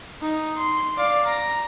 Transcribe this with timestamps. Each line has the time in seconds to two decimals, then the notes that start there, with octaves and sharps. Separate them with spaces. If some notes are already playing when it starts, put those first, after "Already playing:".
0.22 D#4
0.58 C6
0.97 D5 F5
1.26 A#5 A#6